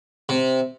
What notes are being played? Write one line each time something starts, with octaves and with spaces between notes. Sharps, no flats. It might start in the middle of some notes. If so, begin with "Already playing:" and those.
C3